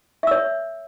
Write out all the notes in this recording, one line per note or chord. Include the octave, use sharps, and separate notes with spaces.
C#5 E5 E6